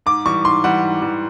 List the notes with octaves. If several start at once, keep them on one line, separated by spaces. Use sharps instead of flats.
G#2 D6
E3 G3 C#6
G#2 C6
E3 G3 F#5
G#2
E3 G3